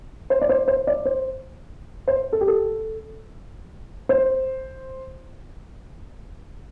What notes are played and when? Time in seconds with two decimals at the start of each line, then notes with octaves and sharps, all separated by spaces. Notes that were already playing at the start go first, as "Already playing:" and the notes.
0.30 C5
0.42 D5
0.49 C5
0.68 C5
0.87 D5
1.05 C5
2.08 C5
2.33 A4
2.41 G4
2.48 A4
4.09 C5